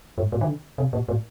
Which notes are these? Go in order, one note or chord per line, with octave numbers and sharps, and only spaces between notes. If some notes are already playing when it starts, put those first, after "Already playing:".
G#2
A2
D#3
D3
C3
A#2
A2